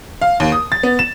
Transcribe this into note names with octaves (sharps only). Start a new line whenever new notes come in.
F5
D#2
D#6
A6
B3
E7